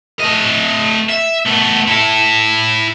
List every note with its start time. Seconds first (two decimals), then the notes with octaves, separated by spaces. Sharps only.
0.20 A3 D#5
1.09 E5
1.46 A3 B3
1.88 E4 A4